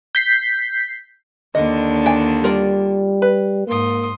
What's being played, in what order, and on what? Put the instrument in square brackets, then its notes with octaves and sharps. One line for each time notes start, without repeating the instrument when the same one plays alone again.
[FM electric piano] G6 B6 C7
[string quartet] D#2 D3 D4 [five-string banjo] D#5
[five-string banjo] G5 G#5
[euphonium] G3 [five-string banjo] F4 A#4 D5
[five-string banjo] B4
[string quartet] G#2 C6 D#6 [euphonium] A#3